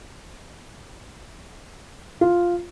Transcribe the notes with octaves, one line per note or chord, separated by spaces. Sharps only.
F4